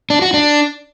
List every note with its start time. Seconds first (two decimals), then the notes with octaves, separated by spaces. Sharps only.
0.10 D4
0.22 F#4
0.34 D4